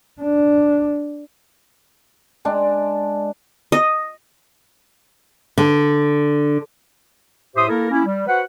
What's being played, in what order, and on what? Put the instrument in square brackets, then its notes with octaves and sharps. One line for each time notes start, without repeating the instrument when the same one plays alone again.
[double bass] D4
[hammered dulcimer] G#3 D4
[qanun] D#5
[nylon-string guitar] D3
[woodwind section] A2 G4 C5 E5 C6 D#6
A#3 E4 A4 A#4
A#3 C#4 E4
G3
F#4 B4 C5 F#5